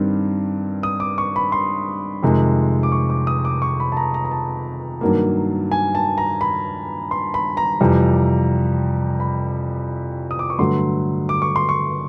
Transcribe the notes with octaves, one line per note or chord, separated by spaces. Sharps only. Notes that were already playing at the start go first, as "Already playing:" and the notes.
Already playing: G2 D#3 G3 C4
D#6
D6
C#6
B5
C6
F2 C3 D#3 G#3
D6
C#6
D6
D#6
D6
C#6
B5
A5
A#5
A#5
A#5
A5
G2 D#3 F#3 A#3
G#5
A5
A#5
B5
C6
B5
A#5
F2 C3 E3 G3
B5
D#6
D6
C#6
G2 D3 F#3 A3 C6
D6
C#6
C6
C#6